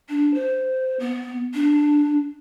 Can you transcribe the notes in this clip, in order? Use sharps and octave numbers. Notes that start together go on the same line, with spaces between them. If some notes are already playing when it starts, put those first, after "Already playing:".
D4
C5
B3
D4